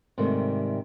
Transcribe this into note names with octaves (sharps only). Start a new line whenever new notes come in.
G#2 C3 D#3 G3 A3